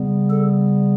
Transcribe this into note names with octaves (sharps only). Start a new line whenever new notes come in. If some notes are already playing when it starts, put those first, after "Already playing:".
Already playing: C#3 G3 B3
A4